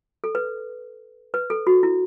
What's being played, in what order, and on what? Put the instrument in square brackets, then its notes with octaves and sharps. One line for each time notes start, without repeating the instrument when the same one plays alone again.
[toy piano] A4
B4
B4
A4
F#4
E4